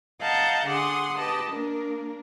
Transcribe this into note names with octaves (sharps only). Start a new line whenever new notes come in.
D#5 F5 F#5 A5 A#5 G6
D3 G#4 F#5 C6 D6 D#6
G4 B4 D#5 A5
A#3 D4 A#4